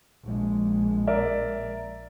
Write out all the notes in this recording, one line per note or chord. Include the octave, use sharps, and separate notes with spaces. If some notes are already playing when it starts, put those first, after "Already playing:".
A#1 G#3
A#4 D5 E5